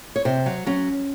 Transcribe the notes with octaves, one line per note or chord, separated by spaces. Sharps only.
C#5
C3 C5
F#3
F#3 C#4